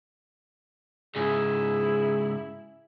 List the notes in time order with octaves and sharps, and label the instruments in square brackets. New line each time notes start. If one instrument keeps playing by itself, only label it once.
[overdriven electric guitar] G#2 C#3 [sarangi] E4 [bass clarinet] G#4